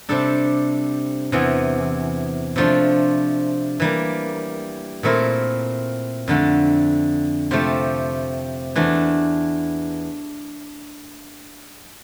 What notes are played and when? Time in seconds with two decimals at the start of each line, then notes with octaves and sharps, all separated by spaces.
0.09 C3 G3 D4 A4
1.32 E2 C3 E3
2.56 C3 F3 A3 D4
3.80 E3 G3 A#3
5.03 A#2 A3 C4 E4 A#4
6.28 F2 D3 A3
7.51 C3 F3 A3 C4 G4
8.76 E2 E3 A3 D4